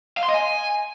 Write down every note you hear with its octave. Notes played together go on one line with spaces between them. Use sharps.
F5
C6
D#5
G#5